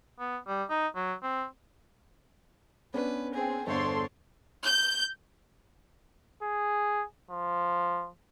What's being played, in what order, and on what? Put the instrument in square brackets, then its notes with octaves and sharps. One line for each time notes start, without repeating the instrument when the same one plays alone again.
[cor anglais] B3
G3
D#4
F#3
C4
[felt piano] B3 C#4 D4 [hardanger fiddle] B4
[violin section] C4 [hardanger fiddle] G#4
[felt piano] G1 E2 [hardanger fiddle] D4 C#5 [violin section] A4 C5 C6
[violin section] G6
[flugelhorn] G#4
F3